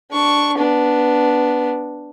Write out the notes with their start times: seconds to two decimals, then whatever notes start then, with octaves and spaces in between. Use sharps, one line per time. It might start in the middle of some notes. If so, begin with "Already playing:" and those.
0.11 D4 C#6
0.57 B3 D4